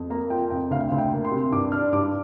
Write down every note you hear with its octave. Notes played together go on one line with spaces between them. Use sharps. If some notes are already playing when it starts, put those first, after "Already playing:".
Already playing: F2
A#3 A#5
F4 G5
F2 G5
D2 F5
D2
G5
A#3
C6
C3
G2 D6
D4 F6
G2 D6